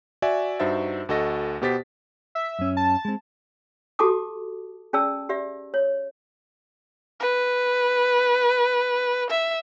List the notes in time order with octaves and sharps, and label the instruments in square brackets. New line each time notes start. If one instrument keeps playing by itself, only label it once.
[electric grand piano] F#4 D5 E5 G#5
G2 D#4 F#4 C5 E5 A6
D2 F#4 A4 D#5 A#6
B2 B3 G4 C5 A6 B6
[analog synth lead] E5
[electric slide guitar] F#2 C#4
[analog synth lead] A5
[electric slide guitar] G#3 C4
[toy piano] F#4 G4 A4 A5 D6 D#6
C#4 G#4 D5 A5 E6
G4 D5 E5
C#5
[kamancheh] B4
E5